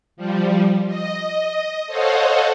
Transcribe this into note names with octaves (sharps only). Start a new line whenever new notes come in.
F3 G3
D#5
A4 C5 C#5 D#5 F5 F#5